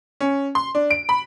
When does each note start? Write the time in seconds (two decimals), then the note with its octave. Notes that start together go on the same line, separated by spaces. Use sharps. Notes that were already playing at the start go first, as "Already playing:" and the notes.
0.21 C#4
0.55 C6
0.75 D4
0.91 D7
1.09 B5